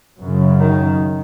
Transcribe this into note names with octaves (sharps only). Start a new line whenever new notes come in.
F#2 C#3
D#3